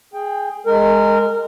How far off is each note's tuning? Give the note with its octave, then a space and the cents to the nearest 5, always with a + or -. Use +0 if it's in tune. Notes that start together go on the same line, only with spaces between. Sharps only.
G#4 +0 G5 +15
G#3 +0 A#4 -20